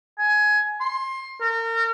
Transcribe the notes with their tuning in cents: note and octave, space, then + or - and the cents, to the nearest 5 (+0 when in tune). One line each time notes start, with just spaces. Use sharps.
G#5 +15
C6 +25
A#4 -35